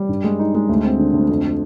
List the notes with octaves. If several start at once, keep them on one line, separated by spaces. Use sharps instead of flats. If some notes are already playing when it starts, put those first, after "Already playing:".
Already playing: G3
G2
G#3
D#4
G#3
D2
C4
D3
D2
F2